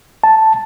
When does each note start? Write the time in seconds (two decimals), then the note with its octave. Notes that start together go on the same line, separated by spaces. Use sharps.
0.24 A5